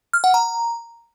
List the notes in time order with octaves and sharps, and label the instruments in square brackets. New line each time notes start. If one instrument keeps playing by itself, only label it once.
[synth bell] F6
F#5
A#5